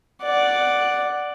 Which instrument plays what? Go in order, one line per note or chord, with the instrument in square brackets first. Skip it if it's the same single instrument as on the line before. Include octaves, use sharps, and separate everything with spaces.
[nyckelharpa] D5 F#5